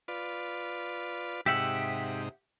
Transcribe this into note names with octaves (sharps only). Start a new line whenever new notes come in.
F4 B4 D5
G#2 C3 D#4 G4 E5 F#5